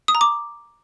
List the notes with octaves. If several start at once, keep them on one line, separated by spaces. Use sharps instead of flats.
D#6
A#5
D6